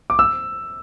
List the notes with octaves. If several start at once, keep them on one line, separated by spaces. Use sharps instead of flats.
D6
E6